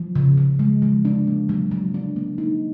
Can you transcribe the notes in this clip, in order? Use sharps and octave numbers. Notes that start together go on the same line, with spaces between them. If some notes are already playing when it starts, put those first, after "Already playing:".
Already playing: F3
C#3
C#3
G#3
F3
D4
A#3
F#3
F#3
D4
A#3
D#4